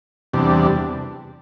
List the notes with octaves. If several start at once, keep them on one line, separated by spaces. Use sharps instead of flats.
E2 C3 G3 D4